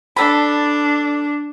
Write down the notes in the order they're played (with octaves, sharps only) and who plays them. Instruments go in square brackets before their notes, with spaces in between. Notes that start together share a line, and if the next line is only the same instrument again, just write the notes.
[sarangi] D4 [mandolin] A4 B5